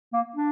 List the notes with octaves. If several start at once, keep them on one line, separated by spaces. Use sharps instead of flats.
A#3
D4